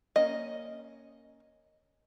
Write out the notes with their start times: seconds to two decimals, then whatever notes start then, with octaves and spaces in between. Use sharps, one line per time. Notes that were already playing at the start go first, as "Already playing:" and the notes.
0.16 A#3 C#4 D#5